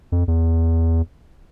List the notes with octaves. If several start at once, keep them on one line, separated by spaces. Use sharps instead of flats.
F2
E2